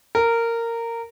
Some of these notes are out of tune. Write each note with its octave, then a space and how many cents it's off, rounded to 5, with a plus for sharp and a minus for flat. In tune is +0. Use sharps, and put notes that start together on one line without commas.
A#4 -15